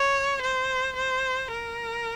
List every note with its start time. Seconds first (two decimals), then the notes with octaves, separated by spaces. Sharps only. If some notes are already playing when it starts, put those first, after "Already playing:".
Already playing: C#5
0.42 C5
0.96 C5
1.51 A#4